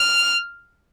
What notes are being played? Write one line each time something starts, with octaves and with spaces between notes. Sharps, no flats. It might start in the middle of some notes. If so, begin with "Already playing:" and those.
Already playing: F6